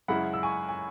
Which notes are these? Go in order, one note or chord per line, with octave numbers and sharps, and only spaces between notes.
F#2 C#3 G#3 E4 F#5 B5
E6
G#5 C#6
G#5